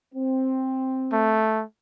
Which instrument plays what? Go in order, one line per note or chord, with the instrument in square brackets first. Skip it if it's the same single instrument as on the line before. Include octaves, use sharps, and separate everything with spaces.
[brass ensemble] C4
[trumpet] A3